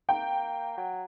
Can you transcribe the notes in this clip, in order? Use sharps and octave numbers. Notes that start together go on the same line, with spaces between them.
A#3 G5
F#3